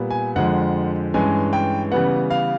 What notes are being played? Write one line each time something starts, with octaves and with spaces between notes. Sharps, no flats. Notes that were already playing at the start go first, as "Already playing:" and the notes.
Already playing: A#2 G3 B3
G#5
F2 D3 F3 G#3 F#5
G2 E3 G#3 C#4 G#5
G5
C#3 E3 G3 B3 F#5
F5